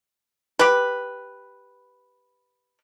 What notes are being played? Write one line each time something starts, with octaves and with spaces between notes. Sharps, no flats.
G4 B4